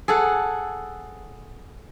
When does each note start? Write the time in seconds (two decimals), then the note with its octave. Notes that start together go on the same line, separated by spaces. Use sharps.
0.08 G#4 A4 F#5